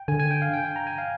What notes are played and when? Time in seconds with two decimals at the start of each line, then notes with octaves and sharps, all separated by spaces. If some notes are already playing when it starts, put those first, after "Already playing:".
Already playing: G5
0.08 D3 G#5
0.20 G#5
0.31 G5
0.42 F5
0.53 G5
0.65 G#5
0.76 A#5
0.87 G#5
0.98 F5